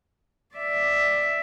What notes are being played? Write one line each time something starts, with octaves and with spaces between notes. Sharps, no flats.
D5 E5